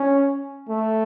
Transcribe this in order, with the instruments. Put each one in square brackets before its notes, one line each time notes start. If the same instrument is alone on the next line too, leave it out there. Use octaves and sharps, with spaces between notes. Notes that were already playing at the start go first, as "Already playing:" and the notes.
Already playing: [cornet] C#4
A3